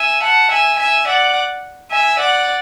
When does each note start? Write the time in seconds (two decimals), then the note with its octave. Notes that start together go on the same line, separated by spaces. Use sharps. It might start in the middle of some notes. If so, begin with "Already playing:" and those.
Already playing: E5 G#5
0.22 F#5 A5
0.50 E5 G#5
0.78 E5 G#5
1.07 D5 F#5
1.90 E5 G#5
2.19 D5 F#5